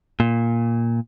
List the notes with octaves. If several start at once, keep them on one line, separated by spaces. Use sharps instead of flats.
A#2